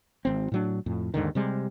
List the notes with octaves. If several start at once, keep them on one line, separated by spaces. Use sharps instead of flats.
G#1 C4
A2 F#3 D4
F2 A2
D#2 G#2 D3 D#3
C3 G3 G#3